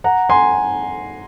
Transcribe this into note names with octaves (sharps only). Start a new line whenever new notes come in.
F#5 A#5
G#5 C6